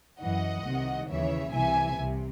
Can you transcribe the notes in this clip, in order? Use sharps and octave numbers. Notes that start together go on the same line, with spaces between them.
F#2 E3 D#5 F#5
C2 C3 D#3
D#2 C#3 E3 C#5 E5
C2 C3 E3 E5 G#5
C2 C3